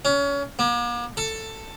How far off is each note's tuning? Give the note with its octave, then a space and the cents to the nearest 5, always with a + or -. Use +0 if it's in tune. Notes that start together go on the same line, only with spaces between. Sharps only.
C#4 +25
A#3 +45
A4 +10